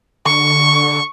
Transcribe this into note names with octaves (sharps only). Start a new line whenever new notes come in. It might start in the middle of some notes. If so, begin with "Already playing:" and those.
D3 C#6